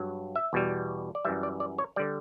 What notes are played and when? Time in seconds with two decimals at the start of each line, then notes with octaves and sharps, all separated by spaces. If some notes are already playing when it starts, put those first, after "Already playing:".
Already playing: G2 F#3
0.36 E5
0.53 E2 B2 G3
1.15 D5
1.25 F#2 E3 G3 E5
1.43 D5
1.60 D5
1.78 C#5
1.96 D3 G3 D5